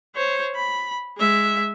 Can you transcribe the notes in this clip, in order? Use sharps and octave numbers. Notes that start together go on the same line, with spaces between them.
C5 C#5
B5
G#3 E5